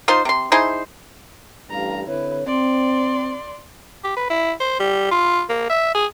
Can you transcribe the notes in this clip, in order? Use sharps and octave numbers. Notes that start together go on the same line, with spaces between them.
D#4 F4 C5
C3 C6
D#4 E4 G#4 C5
A1 G2 F5 A#5
D3 C4 E4 B4 C#5
C4 D5 C6
G4
B4
E4
C5
G3
F4
A#3
E5
G#4